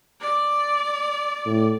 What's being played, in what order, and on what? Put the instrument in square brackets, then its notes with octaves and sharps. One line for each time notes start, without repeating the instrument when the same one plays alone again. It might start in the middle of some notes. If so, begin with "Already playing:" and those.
[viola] D5
[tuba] A2